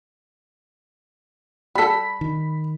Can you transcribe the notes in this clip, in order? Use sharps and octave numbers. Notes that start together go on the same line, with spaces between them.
G3 A4 B5 B6
D#3